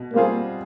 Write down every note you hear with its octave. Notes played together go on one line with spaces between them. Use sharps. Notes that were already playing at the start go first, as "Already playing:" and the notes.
Already playing: B2
G3 A#3 C4 F4 G#4